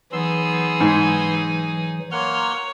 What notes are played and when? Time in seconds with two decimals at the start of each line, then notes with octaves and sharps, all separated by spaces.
0.12 E3 F#3 B3 D#4 G#4 C6 E6
0.80 G#2
2.12 A#3 C#5 F#5 A#5 C6 F6